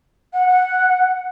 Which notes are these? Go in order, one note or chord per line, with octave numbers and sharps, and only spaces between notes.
F#5
F#5